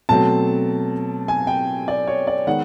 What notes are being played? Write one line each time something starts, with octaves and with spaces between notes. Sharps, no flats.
B2 F#3 A3 C4 A5
G#5
G5
D5
C#5
D5
D#3 G#3 B3 F#5